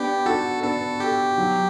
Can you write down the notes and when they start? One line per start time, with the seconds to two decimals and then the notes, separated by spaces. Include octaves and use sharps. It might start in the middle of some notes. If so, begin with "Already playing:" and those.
Already playing: B3 D4 G4
0.26 D4 F#4 A4
0.63 B3 D4 A4
1.00 G4
1.38 F#3